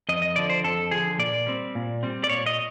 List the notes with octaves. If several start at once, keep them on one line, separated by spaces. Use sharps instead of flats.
F2 D#5
D#5
D3 F3 D5
C5
F2 A4
D3 F3 G#4
A#2 D5
G3 C4
A#2
G3 C4
D5
A#2 C#5
D#5